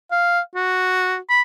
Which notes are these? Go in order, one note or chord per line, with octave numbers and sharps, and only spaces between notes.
F5
F#4
B5